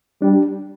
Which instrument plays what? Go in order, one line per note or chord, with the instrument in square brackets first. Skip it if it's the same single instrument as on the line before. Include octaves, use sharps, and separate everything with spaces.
[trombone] G3 [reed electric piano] D4